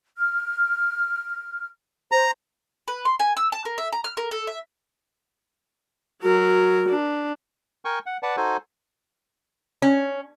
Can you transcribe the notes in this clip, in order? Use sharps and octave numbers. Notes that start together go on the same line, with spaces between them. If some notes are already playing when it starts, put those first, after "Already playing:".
F6
C5 A#5
B4
C6
G#5
E6
A5
A#4
E5
A#5
F6
A#4
A4
E5
F#3 F#4 A#4
D4
A#4 G5 G#5 C#6
F#5
B4 D5 F#5 A5
D#4 F#4 A4 C5 G#5
C#4